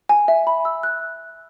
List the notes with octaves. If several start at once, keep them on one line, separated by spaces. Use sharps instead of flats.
G#5
E5
B5
E6
F#6